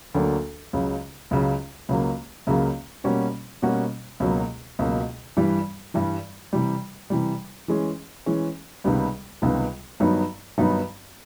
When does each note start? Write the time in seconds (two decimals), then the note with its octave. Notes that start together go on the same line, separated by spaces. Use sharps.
0.15 D2 D3 F#3 A#3 D4
0.73 C#2 C#3 F#3
1.31 C#2 C#3 F#3
1.89 C#2 C#3 F#3 A#3
2.47 C#2 C#3 F#3 A#3
3.04 B2 G3 A#3 C#4 F#4
3.62 B2 G3 A#3 C#4 F#4
4.20 C#2 B2 F#3 A#3
4.79 C#2 B2 F#3 A#3
5.37 G2 E3 G3
5.94 G2 E3 G3
6.53 C3 E3 G3
7.10 C3 E3 G3
7.68 E3 G#3 C#4
8.26 E3 G#3 C#4
8.84 C#2 C3 D#3 G3 B3
9.42 C#2 C3 D#3 G3 B3
10.00 G2 D#3 F#3 B3 D#4
10.58 G2 D#3 F#3 B3 D#4